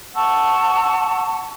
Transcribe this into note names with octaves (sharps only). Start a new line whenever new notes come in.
F#5 A5 C#6 E6